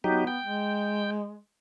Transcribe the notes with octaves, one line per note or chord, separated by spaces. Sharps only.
F#3 B3 D#4 G4
G5
G#3